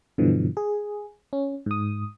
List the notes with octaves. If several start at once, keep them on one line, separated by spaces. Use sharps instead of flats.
G2 B2 D3 E3 F3
G#4
C#4
G#2 D#6